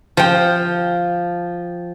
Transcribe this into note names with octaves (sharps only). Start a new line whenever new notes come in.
F3 G5